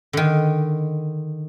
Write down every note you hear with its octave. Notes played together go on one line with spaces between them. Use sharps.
D3 D#3